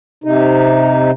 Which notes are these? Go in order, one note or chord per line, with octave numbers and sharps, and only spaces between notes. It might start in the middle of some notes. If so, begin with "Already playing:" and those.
C3 D#4